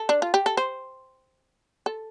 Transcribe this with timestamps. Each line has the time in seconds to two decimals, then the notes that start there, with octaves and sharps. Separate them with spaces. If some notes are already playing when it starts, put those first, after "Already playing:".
Already playing: A4
0.09 D4
0.22 F4
0.34 G4
0.46 A4
0.57 C5
1.86 A4